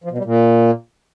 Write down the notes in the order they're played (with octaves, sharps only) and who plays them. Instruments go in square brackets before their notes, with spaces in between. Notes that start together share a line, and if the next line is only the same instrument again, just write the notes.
[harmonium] F3
B2
G3
A#2